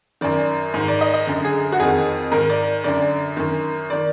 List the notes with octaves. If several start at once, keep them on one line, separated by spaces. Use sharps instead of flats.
F#2 D#3 D5
G#2 D#3
D5
D#5
D#5
F#2 D3
G#4
F#4
F2 D#3 G#4
G#2 D#3 A#4
D5
F#2 D3 D5
F#2 D#3
D#3 D5